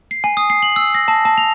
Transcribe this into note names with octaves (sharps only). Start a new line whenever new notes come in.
C7
G#5
D#6
C7
F#7
E6
A#6
A5
A5
F7